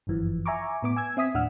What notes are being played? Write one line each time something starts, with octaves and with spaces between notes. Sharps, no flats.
G1 F#2 E3 F3
E5 G#5 A#5 C#6 D6
A2 B3 D6
G#5 E6 G#6
C4 E5 D#6 B6
D#2 A2 D4 F#5 E6 F6